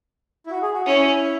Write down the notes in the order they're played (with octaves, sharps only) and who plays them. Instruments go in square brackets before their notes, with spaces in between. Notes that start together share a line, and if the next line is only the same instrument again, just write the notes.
[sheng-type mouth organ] E4
F#4
G#4
F#4
[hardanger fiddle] C#4 [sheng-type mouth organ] E4